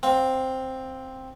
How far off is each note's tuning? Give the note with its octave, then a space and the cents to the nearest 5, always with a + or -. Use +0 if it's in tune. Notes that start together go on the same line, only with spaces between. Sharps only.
C4 +0 F5 +25